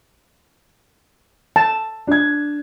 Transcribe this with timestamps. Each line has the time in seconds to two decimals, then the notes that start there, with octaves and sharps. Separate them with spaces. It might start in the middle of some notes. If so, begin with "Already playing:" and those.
1.56 A5
2.07 D4 G#6